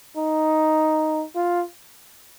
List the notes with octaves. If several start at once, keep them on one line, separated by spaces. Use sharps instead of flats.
D#4
F4